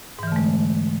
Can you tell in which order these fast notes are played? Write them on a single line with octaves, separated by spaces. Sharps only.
G#2 E3 D3 A3 G#3